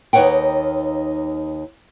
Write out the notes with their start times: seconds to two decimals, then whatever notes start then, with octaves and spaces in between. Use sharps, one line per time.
0.13 D#2 D#4 B4 C#5 F#5 G5